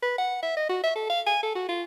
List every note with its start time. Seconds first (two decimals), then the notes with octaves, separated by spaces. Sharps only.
0.02 B4
0.18 F#5
0.43 E5
0.57 D#5
0.69 F#4
0.84 E5
0.96 A4
1.09 F5
1.27 G#5
1.43 A4
1.55 F#4
1.69 F4